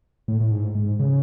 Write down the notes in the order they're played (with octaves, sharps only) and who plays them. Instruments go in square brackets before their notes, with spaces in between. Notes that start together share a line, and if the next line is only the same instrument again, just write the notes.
[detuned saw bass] A2
A2
G#2
G#2
C#3